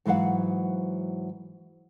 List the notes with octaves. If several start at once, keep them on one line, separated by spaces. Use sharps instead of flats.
G#2 E3 F#3 F5 F#5